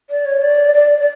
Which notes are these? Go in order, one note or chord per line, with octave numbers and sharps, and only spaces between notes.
D5
C#5
D5
D5
D5